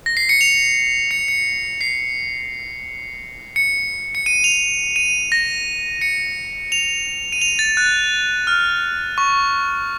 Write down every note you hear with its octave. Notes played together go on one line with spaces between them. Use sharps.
A#6
C7
C#7
F7
C#7
C#7
C7
C#7
C#7
D#7
F7
D#7
A#6
C#7
F7
D#7
F7
A6
F#6
F6
C#6